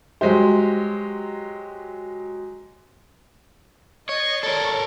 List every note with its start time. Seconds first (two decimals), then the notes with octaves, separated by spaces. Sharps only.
0.21 F#3 G#3 G4 C5
4.09 C#5 D#5 A6 C7
4.43 A4 A#4 C#5 D5 C#6